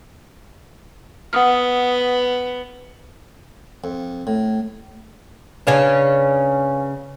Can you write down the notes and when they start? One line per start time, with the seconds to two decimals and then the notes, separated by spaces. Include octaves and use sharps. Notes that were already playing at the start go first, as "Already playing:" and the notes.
1.33 B3 F#5 D#6 F6
3.84 F2
4.27 A2
5.67 C#3 C#4 D4 B4 F5 G#5